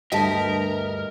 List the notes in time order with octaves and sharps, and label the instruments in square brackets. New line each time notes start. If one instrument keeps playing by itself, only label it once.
[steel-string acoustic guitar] D2 G2 [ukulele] G4 E5 A5 [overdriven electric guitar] A#4 [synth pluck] D#5